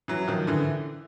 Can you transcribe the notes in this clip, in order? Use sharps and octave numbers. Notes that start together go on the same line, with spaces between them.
E3 F#3
D#3 F3
D3 E3